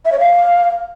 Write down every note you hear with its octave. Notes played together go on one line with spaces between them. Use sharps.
E5
C#5
F5